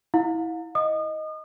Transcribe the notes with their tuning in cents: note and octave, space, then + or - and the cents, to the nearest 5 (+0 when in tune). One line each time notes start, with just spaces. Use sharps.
E4 -20 F5 +40
D#5 +0 D#6 -40